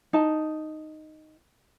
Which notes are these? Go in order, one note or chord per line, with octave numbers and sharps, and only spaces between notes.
D#4 A5